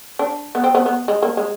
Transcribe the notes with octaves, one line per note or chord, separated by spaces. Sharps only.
D4
B3
C4
B3
B3
G#3
A#3
G#3